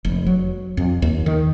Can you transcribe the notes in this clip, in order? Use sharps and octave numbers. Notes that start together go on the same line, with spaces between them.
F1
F#3
F2
D#2
D#3